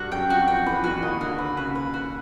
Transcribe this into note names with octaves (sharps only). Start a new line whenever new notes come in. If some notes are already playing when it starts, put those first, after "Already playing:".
Already playing: G2 G3 F#4
F#2 F#3 G5
F2 F3 F#4
F2 F3 G5
E2 E3 B4
E2 E3 F#4
D#2 D#3 D#5
D3 F#4
D3 B4
C#3 F#4
B4
F#4